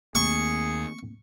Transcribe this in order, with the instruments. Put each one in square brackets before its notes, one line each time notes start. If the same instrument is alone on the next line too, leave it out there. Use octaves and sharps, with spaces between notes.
[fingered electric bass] D#2 [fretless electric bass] A3 A#3 C4 [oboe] G#4 [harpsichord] C#6